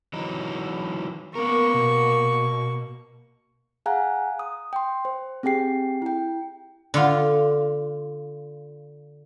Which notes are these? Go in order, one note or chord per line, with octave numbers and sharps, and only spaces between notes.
E3 F#3 D#4
A#3 B3 A#4 C#6
B2
G#4 F5 F#5 G#5 A#5 F#6
D#6
G5 C6
C5
C4 G4 G#4 G5 C7
E4 G5
D3 F4